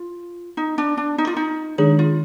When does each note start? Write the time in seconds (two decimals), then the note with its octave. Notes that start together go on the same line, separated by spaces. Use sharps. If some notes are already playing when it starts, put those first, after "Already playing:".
Already playing: F4
0.57 D#4
0.78 D4
0.97 D4
1.18 D#4
1.27 F4
1.37 D#4
1.78 D#3 G#3 D4 D#4 G#4
1.99 F4